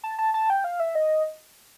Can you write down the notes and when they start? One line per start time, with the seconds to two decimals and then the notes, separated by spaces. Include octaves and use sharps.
0.04 A5
0.19 A5
0.34 A5
0.50 G5
0.64 F5
0.80 E5
0.95 D#5